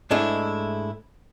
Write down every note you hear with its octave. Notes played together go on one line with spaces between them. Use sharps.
G#2 G#3 A3 D4 E4